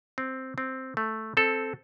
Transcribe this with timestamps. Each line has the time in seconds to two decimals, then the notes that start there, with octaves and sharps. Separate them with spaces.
0.18 C4
0.58 C4
0.97 A3
1.37 C4 A4